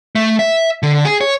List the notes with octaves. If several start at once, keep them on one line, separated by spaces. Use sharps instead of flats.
A3
E5
D3
G#4
C#5